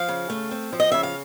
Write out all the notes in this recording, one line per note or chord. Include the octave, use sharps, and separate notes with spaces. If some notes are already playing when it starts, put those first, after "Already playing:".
Already playing: F3 F5
C#3
A3
C4
F3
D#5
C#3 E5
F5